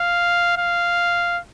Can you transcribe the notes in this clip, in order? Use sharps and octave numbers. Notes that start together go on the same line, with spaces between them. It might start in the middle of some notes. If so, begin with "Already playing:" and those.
Already playing: F5
F5